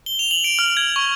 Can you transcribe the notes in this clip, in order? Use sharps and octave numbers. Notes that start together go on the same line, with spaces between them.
G7
F7
F#7
D7
F6
G#6
C#6